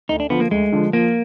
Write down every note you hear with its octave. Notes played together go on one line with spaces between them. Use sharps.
D2 D#4
D4
D3 F3 B3
A#3
D2 G#3
D3 F3
F3 A#3